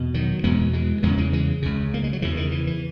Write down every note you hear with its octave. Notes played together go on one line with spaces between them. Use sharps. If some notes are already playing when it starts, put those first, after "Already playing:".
Already playing: E2 B2
D#3 F#3
E2 B2 G#3 B3
E3 G#3
E2 C#3 G#3 B3
E3 G#3
E3 G#3
C#2 C#3
A#3
G#3
F#3
E2 C#3 E3
D#3
E3
E3